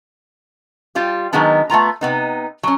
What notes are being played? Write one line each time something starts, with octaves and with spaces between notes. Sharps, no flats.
G3 F4 G4
D#3 F#3 G#3 B3 D4
A3 B3 F4 A#5
C3 B3 D#4
F#3 C#4